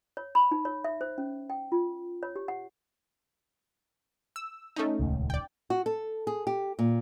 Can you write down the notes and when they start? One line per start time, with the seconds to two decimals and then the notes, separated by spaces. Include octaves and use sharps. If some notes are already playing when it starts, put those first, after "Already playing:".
0.17 C#5
0.35 B5
0.51 D#4
0.65 C#5
0.84 E5
1.01 C5
1.18 C#4
1.50 G5
1.72 F4
2.23 C#5
2.36 G4
2.48 F#5
4.36 E6
4.76 A3 C#4 D#4
5.00 D#1 C#2
5.30 D5 G5
5.70 F#4
5.86 A4
6.27 G#4
6.47 G4
6.79 A#2